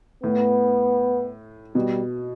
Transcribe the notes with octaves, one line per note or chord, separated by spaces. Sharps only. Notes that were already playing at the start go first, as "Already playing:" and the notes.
A2 B3
B2 G3